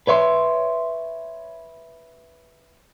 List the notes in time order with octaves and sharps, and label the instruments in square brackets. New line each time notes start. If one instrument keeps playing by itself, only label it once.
[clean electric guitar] B4 C#5 E5 C6